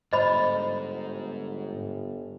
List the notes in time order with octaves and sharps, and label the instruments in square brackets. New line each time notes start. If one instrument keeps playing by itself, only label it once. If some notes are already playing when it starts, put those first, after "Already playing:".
[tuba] G1 [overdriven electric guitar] G#2 [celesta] C5 [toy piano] D#5 B5